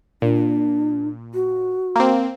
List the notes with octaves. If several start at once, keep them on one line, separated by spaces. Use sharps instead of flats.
A#2 D4
F#4
A#3 C4